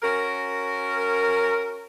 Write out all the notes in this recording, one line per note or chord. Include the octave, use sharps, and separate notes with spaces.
C#4 F#4 A#4